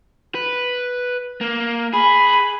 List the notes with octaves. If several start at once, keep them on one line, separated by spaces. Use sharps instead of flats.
B4
A#3
G#4 B5